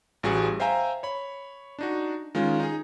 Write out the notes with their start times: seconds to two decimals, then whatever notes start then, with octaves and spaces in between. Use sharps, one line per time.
0.23 A1 G3 F#4 G#4 F#5
0.60 C5 E5 F5 G5 G#5 A#5
1.03 C#5 B5
1.79 D4 D#4 F#4
2.35 D#3 G#3 C#4 F4
2.60 D#4 G#4